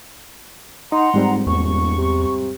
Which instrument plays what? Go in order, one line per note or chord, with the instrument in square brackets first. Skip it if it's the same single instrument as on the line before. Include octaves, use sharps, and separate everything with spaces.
[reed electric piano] D#4 [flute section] F#5 A#5 C6
[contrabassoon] F1 [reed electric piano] G#2 G3 C4
[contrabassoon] D#1 [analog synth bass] E2 [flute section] C#6
[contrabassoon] C3